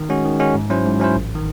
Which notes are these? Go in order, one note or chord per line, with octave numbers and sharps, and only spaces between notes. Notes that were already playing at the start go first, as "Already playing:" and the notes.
Already playing: D#3
G#3 C#4 F#4
D#3
G#3 C#4 F#4
G#2
F#3 C#4 E4 C5
G#2
F#3 C#4 E4 C5
A1
D#3